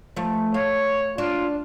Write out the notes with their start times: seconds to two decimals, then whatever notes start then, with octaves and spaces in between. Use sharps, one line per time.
0.16 F3 A3
0.54 C#5 F5
1.18 D4 F4